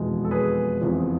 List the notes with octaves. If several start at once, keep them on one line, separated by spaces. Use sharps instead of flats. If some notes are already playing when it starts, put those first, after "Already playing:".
Already playing: F1 E2 B2 G#3
A4
G#4 B4
F1 E2 C3 F3